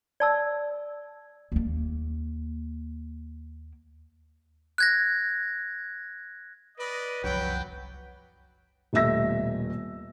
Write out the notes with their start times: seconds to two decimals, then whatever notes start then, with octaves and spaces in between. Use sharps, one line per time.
0.20 D5 A5 E6
1.52 D#2 A#3
4.78 F#6 G#6 A#6
6.78 B4 D5 D#5
7.24 F#1 C2 F3 F#3 G5
8.93 D#1 B2 A3 E5 E6 A#6